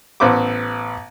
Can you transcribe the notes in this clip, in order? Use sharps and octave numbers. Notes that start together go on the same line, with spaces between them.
A1 B3 C5 E5 D6